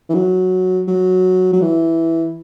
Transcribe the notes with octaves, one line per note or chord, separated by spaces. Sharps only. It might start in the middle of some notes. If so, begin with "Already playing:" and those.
E3
F#3
F#3
F#3
E3